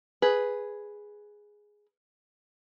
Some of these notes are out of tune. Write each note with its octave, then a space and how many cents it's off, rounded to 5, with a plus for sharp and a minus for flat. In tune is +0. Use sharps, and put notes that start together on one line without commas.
G#4 +0 B4 +0